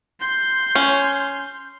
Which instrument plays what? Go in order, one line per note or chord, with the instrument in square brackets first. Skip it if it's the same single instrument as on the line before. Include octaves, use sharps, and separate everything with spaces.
[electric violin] C6 G6
[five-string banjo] C#4